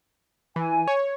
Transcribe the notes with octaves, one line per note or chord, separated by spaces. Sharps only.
E3 G#5
C#5